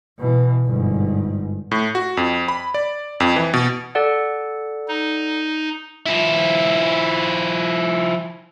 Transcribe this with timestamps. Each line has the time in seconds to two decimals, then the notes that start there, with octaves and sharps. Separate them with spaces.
0.18 B2 E3
0.66 G1 G#2
1.71 A2
1.95 F#4
2.17 F2
2.48 B5
2.74 D5
3.20 F2
3.36 E3
3.54 B2
3.95 A4 D5 F#5
4.88 D#4
6.06 F3 E4